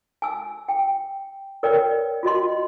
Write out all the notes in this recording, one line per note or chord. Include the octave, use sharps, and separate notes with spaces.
G#5 E6
G5
A#4 B4 C#5 D5 G5
D5
F4 F#4 D#5 C6